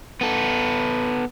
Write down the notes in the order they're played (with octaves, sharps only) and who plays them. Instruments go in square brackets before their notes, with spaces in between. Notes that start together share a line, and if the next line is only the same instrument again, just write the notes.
[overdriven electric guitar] B3 A4